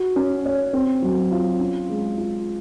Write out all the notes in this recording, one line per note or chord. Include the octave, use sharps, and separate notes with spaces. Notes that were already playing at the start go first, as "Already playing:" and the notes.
Already playing: F#4
C#4
C#5
C4
F#3
F4
C#4
G#3
F4